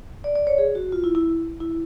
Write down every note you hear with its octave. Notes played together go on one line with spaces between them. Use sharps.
D5
D5
C#5
G#4
F#4
F4
E4
E4
E4